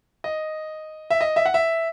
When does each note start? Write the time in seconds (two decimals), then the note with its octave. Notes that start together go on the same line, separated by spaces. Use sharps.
0.24 D#5
1.10 E5
1.21 D#5
1.36 E5
1.46 F#5
1.54 E5